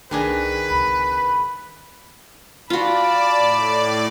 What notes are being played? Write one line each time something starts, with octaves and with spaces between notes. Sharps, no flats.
C2 D#3 D4 G#4 B4
C#2 C3 B5
F4 F#4 D5 A5 B5
A2 D5